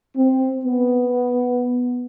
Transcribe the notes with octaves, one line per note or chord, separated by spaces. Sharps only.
C4
B3